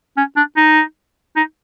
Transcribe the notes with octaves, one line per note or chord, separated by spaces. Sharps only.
C#4
D4
D#4
D#4